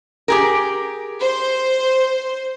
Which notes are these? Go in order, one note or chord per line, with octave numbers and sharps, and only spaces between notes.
G4 G#4 A#4
C5